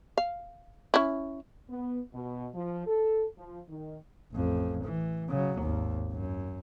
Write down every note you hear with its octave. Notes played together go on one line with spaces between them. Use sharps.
F5
C#4 E4
B3
B2
F3
A4
F3
D#3
A1 F2
E3
C#3 F#3
G#1 D#2
F#2